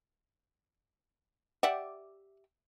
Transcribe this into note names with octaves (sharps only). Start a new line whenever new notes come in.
G4 D5 E5 F#5